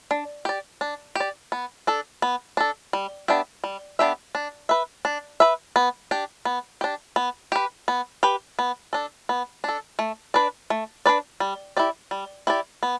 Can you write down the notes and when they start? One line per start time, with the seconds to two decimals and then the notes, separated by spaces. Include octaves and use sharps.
0.11 D4
0.45 G4 D5
0.81 D4
1.15 G4 D5
1.52 B3
1.87 D4 A4
2.22 B3
2.57 D4 A4
2.93 G3
3.28 B3 D4 G4 E5
3.64 G3
3.99 B3 D4 G4 E5
4.35 D4
4.69 B4 E5
5.05 D4
5.40 B4 E5
5.76 B3
6.11 D4 G4
6.45 B3
6.81 D4 G4
7.16 B3
7.52 G4 B4
7.88 B3
8.23 G4 B4
8.59 B3
8.93 D4 A4
9.29 B3
9.64 D4 A4
9.99 A3
10.34 D4 B4 D5
10.70 A3
11.06 D4 B4 D5
11.40 G3
11.77 E4 G4 D5
12.11 G3
12.47 E4 G4 D5
12.83 B3